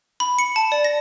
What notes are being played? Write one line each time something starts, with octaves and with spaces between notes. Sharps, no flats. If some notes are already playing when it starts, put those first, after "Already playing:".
B5
C#7
A5
D5
A#6